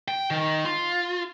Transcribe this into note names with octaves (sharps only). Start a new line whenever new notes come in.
G5
D#3
F4